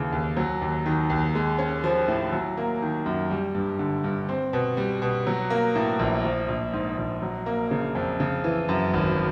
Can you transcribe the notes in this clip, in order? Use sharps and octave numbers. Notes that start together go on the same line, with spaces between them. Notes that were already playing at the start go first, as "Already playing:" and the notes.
Already playing: D#2 C#3 E3
D#2
F#3
D#2
D#3
D#2
G#3
C#4
F3
A2
F#3
A#3
D#3
F#2
G3
G2
D3
G2
C4
B2
G3
B2
F#3
A#3
A2
A#1
F3
A#1
G#2
A#1
F#3
A#3
C#3
F2
C#3
E3
F#2
G#1